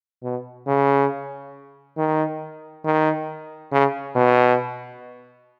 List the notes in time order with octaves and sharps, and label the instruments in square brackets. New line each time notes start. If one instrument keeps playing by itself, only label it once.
[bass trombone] B2
C#3
D#3
D#3
C#3
B2